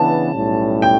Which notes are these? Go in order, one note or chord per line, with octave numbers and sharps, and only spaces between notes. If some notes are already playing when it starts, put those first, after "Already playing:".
Already playing: C#3 E3 B3 D4 A5
B1 A2 G3 C#4
G5